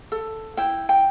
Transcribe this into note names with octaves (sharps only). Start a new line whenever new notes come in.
A4
E4 G5
G5